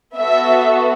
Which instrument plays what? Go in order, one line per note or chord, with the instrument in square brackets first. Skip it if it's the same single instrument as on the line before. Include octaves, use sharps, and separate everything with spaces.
[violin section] B3 F#4 A4 E5